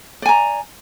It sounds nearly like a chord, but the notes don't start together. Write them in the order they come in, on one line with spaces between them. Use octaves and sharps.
D5 G#5 A#5